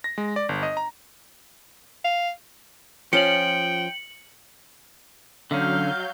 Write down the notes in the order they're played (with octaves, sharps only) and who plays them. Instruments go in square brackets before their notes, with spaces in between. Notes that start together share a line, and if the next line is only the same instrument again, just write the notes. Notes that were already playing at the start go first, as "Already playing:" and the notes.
[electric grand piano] A#6
G#3
D5
G1
D#5
A#5
[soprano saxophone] F5
[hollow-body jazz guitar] F3 C#4 F4 [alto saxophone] G5 [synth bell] C#7 F#7
[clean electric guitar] D3 C#4 [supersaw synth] F#3 G6 [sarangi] F5